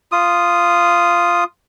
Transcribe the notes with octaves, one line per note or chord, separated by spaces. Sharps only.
F4 D#6